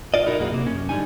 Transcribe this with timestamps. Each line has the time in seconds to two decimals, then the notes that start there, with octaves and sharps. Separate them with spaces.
0.14 G#2 F4 D5 D#5
0.26 B1 D#4 E4 F#4 A#4
0.39 B1 F#2 A#3 F#4 G#4
0.51 C3 A#3
0.67 F#2 C#4
0.89 G#2 D3 E3 G3 D#4 G#5